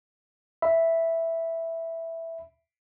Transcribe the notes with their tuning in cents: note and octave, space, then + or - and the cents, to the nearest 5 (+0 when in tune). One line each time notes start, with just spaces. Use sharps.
E5 +0 B5 +0